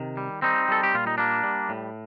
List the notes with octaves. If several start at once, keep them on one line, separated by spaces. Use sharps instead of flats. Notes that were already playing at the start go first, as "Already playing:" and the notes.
Already playing: C3 D#3
G3
G3 C4 D#4
G3 A4
G4
A#2 F4
D#4
G3 A#3 D4
G3
A2